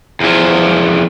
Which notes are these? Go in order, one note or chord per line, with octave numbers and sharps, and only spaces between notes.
E2 F3